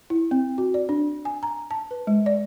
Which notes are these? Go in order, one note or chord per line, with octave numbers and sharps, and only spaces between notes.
E4
C4
F#4
D5
D4
G#5
A#5
A5
B4
G#3
D5